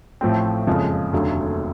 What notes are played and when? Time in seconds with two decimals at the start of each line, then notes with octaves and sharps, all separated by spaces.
0.21 A1 A2 F3 A3 C4
0.67 F#1 F2 C#3 F3 G#3
1.13 F1 D#2 D3 F#3 A3